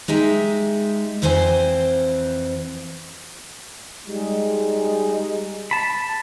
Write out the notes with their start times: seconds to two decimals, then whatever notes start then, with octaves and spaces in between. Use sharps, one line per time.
0.08 G#3 D#4 G4 E5
1.22 F2 E3 C4 C5 G#5
4.07 G3 G#3 D#4
5.71 A5 B5